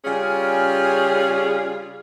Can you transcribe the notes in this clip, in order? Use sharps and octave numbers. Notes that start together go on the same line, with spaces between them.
C#3 G3 C#4 F4 G#4